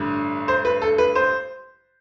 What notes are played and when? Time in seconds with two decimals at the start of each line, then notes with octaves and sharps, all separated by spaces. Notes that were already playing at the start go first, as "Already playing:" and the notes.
Already playing: A1 G2 D3
0.48 C5
0.65 B4
0.82 A4
0.98 B4
1.15 C5